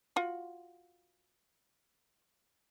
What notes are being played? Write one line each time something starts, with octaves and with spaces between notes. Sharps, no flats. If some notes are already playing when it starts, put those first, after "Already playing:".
F4 F#4